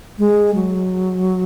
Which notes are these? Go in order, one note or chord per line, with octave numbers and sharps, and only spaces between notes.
G#3
F#3